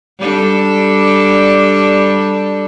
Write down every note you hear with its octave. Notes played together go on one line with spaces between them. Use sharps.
G3 D4 A4